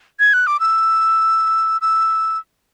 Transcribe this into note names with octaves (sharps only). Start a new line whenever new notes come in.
G#6
F#6
D6
E6
E6